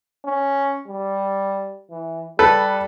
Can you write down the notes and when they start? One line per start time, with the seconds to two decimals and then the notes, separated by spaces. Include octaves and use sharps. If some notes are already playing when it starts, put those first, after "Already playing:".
0.25 C#4
0.87 G3
1.91 E3
2.39 G3 A4 B4